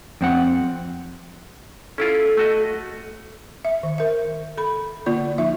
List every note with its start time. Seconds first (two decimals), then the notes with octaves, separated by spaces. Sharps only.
0.21 F2 C4 F#5
1.98 C#4 E4 F4 A4
2.37 A3 F#4 D#5
3.65 E5
3.83 D#3
3.98 A#4 E5
4.58 A4 B5
5.06 D3 A#3 F4 D5
5.38 F3 D#4 F4 E5